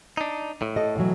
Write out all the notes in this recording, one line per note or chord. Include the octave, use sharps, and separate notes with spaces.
D4 D#4
A2
A4 D#5
B2 E3 F#3